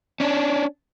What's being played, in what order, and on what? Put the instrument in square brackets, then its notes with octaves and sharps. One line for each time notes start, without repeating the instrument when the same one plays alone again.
[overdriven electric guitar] C#4 D4